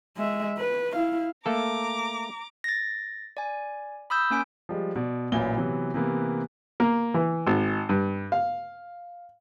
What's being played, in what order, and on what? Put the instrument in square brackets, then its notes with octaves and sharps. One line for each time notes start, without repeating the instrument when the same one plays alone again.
[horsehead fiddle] G#3 E5
B4
E4 F5
[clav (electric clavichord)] A3 A#3 A4 [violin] A#5 D6
[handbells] A6 A#6
D5 G#5
B5 D#6 E6 G6
A#3 C#4 G#5 D7
[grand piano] F3 G3 G#3
B2 D5
A1 A#2 F#3 E4 G#5 G7
C3 E3 F#3 B3
C3 E3 A#3 B3
[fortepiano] A#3
E3
G#1
G2
F5